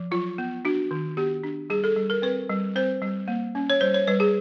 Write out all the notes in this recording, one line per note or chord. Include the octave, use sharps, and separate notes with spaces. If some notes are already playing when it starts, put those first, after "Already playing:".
Already playing: F3
F#3 F4
B3
D4 F#4
D#3
B3 G4
D4
G3 G#4
A4
G3
A#4
C4 B4
G3
C4 C5
G3
A#3
C#4
C#5
G3 C5
C#5
G3 B4
G#4